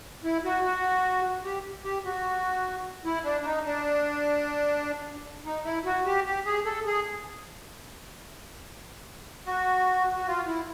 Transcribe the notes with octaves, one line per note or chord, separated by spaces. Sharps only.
E4
F#4
F#4
G4
G4
F#4
E4
D4
D4
D#4
D4
D#4
E4
F#4
G4
G4
G#4
A4
G#4
F#4
F#4
F4
E4